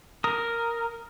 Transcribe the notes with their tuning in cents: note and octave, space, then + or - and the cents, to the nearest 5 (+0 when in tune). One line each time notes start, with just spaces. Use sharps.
A#4 +0 D#6 +10